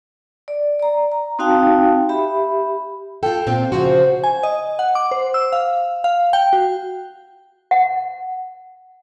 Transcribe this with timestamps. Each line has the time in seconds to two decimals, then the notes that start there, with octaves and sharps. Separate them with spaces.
0.48 D5
0.79 D5 A#5
1.12 A#5
1.39 C4 D#4 F#4 F5 G5 A5
2.09 G4 E5 B5
3.23 F4 A4 G5
3.47 A#2 C4 F4
3.72 C#3 F3 F#4 C5
4.24 G#5
4.43 D#5
4.79 F#5
4.95 D6
5.11 C5
5.34 E6
5.52 F5
6.04 F5
6.33 G5
6.53 F#4
7.71 F#5